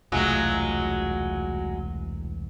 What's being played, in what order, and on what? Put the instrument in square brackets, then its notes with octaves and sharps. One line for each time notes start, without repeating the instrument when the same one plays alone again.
[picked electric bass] E1 C2 A3 [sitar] F#3 G#3 F4